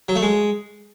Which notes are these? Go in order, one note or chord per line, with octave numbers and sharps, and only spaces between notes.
F#3
A3
G#3